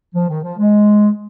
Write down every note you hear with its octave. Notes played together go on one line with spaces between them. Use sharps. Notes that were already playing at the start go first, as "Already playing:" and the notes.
F3
D#3
F3
G#3